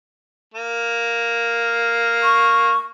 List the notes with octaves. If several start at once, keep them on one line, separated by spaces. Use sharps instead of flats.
A#3
C#6